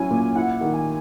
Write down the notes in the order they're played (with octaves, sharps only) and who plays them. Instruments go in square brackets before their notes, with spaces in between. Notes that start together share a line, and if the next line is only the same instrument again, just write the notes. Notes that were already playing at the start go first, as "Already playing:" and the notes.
Already playing: [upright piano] F#3 C#4 E4 [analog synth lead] G#5
[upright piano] A#2
[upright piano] E4 [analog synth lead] F#5
[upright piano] D#3
[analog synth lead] G#5